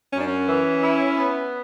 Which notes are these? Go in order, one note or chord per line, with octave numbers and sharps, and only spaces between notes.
F#2 C#4
D4
C#4
E3
E4
B3